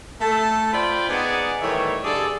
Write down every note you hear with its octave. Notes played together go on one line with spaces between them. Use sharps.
A3 A4 A5
F4 C5 D5 G5 B5
B3 D#4 G#4 D5 F#5 G#5
A2 D#3 E3 G3 C#5 E5
G2 D3 G#4 A4 D5